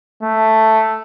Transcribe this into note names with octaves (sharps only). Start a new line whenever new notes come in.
A3